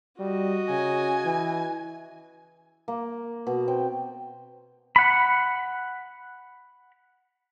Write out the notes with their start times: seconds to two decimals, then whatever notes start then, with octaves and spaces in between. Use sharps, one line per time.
0.19 G3 F#4 D#5
0.70 C#3 G#5
1.25 E3
2.88 A#3
3.47 B2
3.68 C4 G5
4.96 F#5 B5